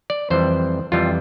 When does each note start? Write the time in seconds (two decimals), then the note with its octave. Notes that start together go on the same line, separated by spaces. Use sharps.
0.10 D5
0.30 F2 E3 G3 C5
0.92 F2 E3 G3 F4